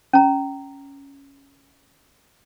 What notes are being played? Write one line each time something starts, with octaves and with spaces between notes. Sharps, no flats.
C#4 A#5